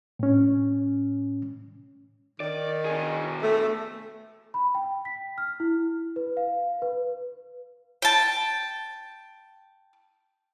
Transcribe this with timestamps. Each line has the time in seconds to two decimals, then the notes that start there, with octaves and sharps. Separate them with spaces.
0.19 A2 C#4
2.40 D#3 D5
2.85 B2 G#4
3.42 A3
4.54 B5
4.75 G5
5.05 B6
5.38 F6
5.60 E4
6.16 B4
6.37 F5
6.82 B4
8.02 G5 A5